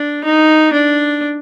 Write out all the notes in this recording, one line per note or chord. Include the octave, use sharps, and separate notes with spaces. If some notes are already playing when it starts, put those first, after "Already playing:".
Already playing: D4
D#4
D4